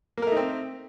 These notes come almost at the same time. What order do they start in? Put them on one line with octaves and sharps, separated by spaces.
A#3 A#4 A3 D#4 C4